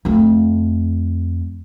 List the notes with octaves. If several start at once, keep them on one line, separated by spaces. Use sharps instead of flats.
F2 A3